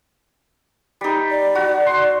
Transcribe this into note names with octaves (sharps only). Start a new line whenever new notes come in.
G3 D#4
D5
F#4
C6